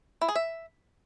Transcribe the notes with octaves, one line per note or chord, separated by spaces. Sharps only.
E4
G#4
E5